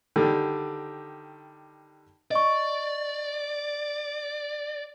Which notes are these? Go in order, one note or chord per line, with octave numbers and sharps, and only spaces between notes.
D3 D#3 G3
D5 D#5 C#6